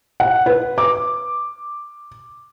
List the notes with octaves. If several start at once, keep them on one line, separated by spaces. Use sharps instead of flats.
F#5
B4
D6